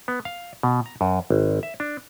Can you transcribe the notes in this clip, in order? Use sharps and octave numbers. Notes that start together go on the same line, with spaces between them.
B3
F5
B2
A#5
F#2
G#1
E5
D4